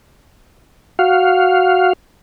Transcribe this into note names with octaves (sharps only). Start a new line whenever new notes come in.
F#4 F5